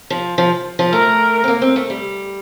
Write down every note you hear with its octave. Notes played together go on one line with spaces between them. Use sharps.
F3
F3
F3
A3 A#4
C4
A#3
C4
A3
G3